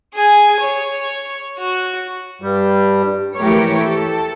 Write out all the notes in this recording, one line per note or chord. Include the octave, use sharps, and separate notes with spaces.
G#4 G#5
C#5
F#4
G2 G3
E3 A3 G4 A#4 C#5
A4